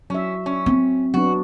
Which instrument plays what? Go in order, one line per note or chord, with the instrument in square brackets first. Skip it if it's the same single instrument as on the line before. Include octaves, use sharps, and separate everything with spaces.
[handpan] F#3 E5 [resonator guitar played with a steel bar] C#4
[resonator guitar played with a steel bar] C#4
[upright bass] C4
[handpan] F#3 B3 D4 [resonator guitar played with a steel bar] F#4